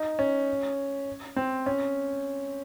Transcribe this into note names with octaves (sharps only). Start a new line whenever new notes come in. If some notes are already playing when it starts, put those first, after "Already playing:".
Already playing: D#4
C#4
C4
C#4